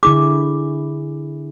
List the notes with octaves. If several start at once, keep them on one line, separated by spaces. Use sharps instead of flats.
D3 E4 G#4 D6